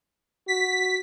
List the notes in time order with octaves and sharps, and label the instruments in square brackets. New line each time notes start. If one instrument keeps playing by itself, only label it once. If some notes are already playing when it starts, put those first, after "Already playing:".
[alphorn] F#4 [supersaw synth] B6